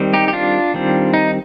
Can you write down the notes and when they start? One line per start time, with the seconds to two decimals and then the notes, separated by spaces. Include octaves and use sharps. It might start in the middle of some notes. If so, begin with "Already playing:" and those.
Already playing: D#3 G3 C4
0.13 D#4 G4
0.28 G4
0.33 D4 F4
0.74 D#3 G3 C4
1.14 D#4